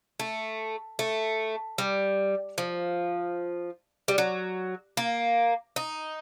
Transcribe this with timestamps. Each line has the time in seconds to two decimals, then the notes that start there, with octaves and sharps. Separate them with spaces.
0.19 A3
0.99 A3
1.78 G3
2.58 F3
4.08 G3
4.18 F#3
4.97 A#3
5.76 D#4